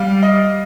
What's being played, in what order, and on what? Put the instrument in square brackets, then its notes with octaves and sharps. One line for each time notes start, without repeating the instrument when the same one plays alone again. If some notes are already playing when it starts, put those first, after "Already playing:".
Already playing: [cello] G3 [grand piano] F5
[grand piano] D#5